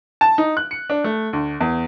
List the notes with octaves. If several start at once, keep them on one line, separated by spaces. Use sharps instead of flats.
A5
D#4
F#6
C#7
D4
A3
D2
E2